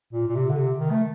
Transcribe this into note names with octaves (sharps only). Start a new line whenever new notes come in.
A#2
A#2
C3
D3
C3
D#3
A3